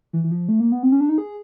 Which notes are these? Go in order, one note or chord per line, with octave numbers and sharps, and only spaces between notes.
E3
E3
F3
A3
A#3
B3
C4
C#4
D4
D#4
G#4